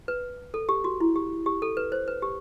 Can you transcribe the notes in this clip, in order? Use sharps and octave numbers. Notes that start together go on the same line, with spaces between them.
B4
A4
G4
F#4
E4
G4
G4
A4
B4
C5
B4
G4